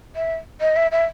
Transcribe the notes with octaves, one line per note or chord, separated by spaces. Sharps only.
E5
D#5
E5
E5